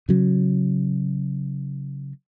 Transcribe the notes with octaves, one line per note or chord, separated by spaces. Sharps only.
C#3 F#3